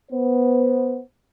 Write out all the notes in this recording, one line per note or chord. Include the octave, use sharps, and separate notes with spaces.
B3 C5